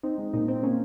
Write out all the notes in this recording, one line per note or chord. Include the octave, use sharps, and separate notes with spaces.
C4 D#4
G#3
A#2 D#4
A#2 C4
A#3 C#4